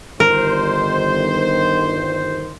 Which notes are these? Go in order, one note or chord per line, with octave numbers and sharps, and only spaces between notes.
G1 D#3 A#4 C5